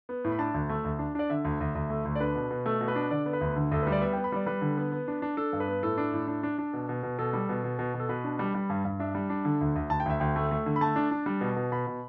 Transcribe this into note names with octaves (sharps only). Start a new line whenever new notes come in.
B3
A2
B5
D4 A5
D2
A3
D2
D4
D4 D5
D3 E5
D2
D2
D2
A3
D2
D5
D4 B4
B2
B2
A3 A4
B2
B4
D4
D3 D5
B3
B4
D2
D3
D2 A4
G3 B4
D5
B3 E5
B3 G5
B5
G3 D5
G3 B4
D3
B3
B3
D4
D4
D4 A4
G2
B4
B3
A2 A4
D4
A2
D4
D4
D4
B2
B2
B2
B2 A4
G3
B2
B2
B2
B2
A4
B2 B4
D4
G3
G3
G2
G2
D4 E5
G3
D4
D3
D2
D2
D2 A5
G5
D2 E5
D2 G5
A3
A3
D3
B5
A3 A5
D4
D4
G3
B2
B2
B2 B5
B2